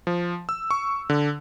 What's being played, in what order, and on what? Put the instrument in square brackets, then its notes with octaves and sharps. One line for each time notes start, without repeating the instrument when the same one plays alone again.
[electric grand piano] F3
E6
C#6
D3